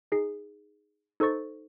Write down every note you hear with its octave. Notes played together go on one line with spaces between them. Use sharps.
D#4 G#4 C7
D#4 A4 C5 C#6 A6